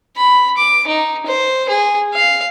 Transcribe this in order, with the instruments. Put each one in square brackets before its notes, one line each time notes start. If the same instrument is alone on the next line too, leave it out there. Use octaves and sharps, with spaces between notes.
[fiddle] B5
D6
D#4
C5
G#4
F5